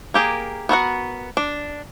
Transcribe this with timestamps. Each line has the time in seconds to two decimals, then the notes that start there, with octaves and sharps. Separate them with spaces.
0.14 A#3 G4 G#4 A#4
0.69 B3 F#4 A#4 F#5
1.37 D4